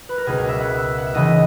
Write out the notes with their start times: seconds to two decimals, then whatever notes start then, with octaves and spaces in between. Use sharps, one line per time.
0.09 B4
0.18 A#4
0.26 C#2 B2 G#4
0.38 A#4
0.49 E5
0.60 F#5
0.71 E5
0.98 F#5
1.06 E5
1.14 C#2 C#3 E3 D#5